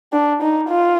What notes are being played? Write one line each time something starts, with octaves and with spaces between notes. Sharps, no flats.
D4
D#4
F4